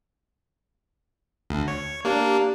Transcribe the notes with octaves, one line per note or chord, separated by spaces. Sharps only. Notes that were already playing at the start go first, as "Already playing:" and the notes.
D2
C#5
A#3 D4 G4